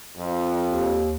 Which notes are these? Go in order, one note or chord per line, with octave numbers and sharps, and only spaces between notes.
F2
D#2